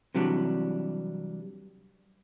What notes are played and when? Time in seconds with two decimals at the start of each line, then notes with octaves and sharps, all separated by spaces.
0.15 C3 E3 F#3 G3 D4